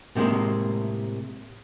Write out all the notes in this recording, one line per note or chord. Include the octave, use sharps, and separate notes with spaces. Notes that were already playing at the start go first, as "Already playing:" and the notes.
A2 C3 D#3 G#3 A#3